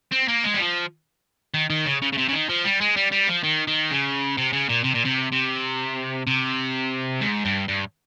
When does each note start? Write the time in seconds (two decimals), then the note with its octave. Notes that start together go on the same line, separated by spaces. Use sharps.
0.12 C4
0.28 A#3
0.44 G#3
0.54 G3
0.60 F3
1.54 D#3
1.70 D#3
1.86 C#3
2.02 C#3
2.12 C#3
2.17 C3
2.28 C#3
2.33 D#3
2.49 F3
2.65 G3
2.81 G#3
2.96 G3
3.11 G3
3.27 F3
3.43 D#3
3.67 D#3
3.90 C#3
4.38 C3
4.53 C#3
4.69 A#2
4.84 C3
4.95 A#2
5.05 C3
5.32 C3
6.27 C3
7.21 G#2
7.45 G2
7.68 G2